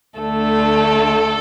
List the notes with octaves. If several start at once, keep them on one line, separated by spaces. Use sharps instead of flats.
D2 D3 A3 A4